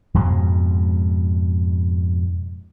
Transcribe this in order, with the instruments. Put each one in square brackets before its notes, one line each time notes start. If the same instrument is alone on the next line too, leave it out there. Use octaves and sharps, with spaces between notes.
[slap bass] F2 G#2 B2 G#3